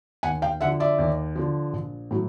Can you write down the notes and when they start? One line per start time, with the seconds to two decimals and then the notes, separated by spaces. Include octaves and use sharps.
0.23 D#2 F#5 G#5
0.42 F5 G5
0.61 D3 F3 E5 F#5
0.80 D5 E5
0.98 D#2
1.36 D3 F3
1.73 A#1
2.11 A2 F#3